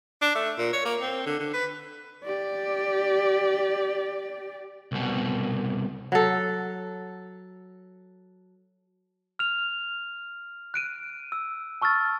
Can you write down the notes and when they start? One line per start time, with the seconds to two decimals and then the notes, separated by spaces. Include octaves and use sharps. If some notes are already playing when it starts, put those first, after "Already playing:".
0.22 D4
0.35 A3
0.58 A#2
0.73 C#5
0.85 A#3
1.01 C4
1.26 D3
1.40 D3
1.54 B4
2.25 G4 D5
4.92 C2 B2
6.12 F#3 A4
9.39 F6 F7
10.74 F#6 D7 D#7
11.32 E6
11.82 A5 C#6 E6 F6 A6